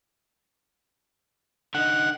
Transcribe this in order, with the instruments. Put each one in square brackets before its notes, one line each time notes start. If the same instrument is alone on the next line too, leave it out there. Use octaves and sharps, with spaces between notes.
[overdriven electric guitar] D3 D#4 [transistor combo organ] F#5